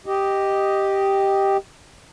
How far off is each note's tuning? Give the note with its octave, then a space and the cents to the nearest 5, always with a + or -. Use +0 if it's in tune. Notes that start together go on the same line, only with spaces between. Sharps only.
G4 +0 D#5 +0